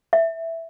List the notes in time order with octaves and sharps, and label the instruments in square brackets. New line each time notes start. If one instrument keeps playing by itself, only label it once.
[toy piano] E5